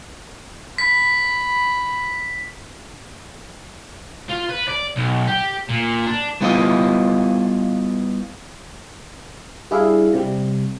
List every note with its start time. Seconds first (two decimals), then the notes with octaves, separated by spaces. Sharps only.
0.78 B5 B6
4.29 F4
4.50 B4
4.68 D5
4.96 B1
5.27 G4
5.69 A#2
6.06 D4
6.41 G3 B3 E4 F4 A#4 D#5
9.71 G3 D4 E4 G#4 E5 F5
10.13 C3 G3